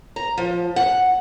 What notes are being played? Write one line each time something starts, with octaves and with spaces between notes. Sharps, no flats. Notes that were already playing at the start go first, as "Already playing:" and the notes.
A#5
F3
F#5